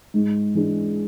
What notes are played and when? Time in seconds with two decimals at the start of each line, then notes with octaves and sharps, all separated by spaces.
0.14 G#2
0.55 E3 G#3 D4